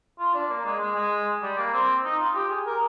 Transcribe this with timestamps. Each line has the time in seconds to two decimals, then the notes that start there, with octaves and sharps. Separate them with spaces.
0.19 F4
0.34 D4
0.50 A#3
0.66 G#3
0.80 G#3
0.96 G#3
1.43 G3
1.58 A#3
1.74 C4
2.04 D#4
2.20 F4
2.35 G4
2.50 G#4
2.67 A#4